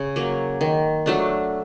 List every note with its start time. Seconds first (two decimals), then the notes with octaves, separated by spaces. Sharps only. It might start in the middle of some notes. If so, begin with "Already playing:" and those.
Already playing: C#3
0.16 F#3 A#3
0.61 D#3
1.06 F#3 A3 D4